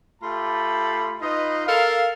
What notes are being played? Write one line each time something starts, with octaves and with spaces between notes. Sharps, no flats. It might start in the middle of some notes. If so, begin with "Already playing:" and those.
A3 F4 G4 A5 B5
D#4 F4 B4 D#5
A4 A#4 F5